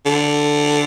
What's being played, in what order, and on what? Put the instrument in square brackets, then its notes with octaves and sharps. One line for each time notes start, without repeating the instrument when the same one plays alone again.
[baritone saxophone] D3